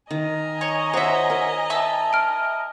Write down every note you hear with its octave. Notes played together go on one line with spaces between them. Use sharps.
D#3 D#5 G#5 A#5
C#5
F#4 C5 C#5 E5
A#4
E5 A5 E6
F6 D7